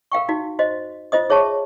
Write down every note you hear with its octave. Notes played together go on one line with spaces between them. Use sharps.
A#4 F5 G5 C#6
D#4 F#4
F#4 C5 D#5
F4 C5 D#5 D#6
G#4 C#5 E5 A5 C#6